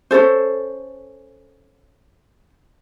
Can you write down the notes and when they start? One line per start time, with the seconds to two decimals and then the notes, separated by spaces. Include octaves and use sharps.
0.11 C#4 D4 A4 C5